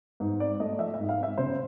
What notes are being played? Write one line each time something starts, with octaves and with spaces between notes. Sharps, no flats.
G#2
C4 D5
A3 D#5
F3 E5
G#2 E5
F5
C4 E5
C#3 C5